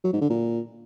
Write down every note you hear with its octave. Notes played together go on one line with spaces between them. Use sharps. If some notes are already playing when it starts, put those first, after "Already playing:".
F#3
G#2
D3
A#2